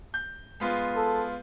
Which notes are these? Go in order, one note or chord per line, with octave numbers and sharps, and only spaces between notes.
G6
G#3 B3 F4
A4